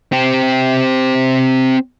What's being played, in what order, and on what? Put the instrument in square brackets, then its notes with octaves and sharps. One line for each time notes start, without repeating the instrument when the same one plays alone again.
[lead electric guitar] C4 G4